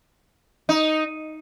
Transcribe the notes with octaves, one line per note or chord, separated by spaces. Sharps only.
D#4